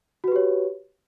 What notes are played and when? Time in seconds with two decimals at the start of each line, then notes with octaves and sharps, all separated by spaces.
0.24 F#4
0.28 B4
0.32 G4
0.36 C#5